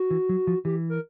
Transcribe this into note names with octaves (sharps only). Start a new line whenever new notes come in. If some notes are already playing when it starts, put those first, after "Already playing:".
Already playing: F#4
E3
F#3
F3
E3 G4
A#4